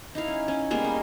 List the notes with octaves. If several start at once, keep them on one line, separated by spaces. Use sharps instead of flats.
D#4 E4 F5
C#4
C#4
G3 G#3 A#3 B3
D#4 C6